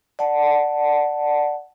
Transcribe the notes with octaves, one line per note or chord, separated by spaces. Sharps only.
D5 F#5 A5